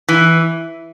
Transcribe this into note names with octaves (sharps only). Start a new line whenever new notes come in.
E3